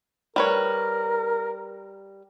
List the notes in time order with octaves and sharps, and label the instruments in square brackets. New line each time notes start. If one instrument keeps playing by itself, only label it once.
[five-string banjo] G3 B4 C#5 [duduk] A#4